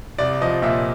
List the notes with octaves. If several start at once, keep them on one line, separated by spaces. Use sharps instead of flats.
C2 D5
F3 D#5
A#2 E5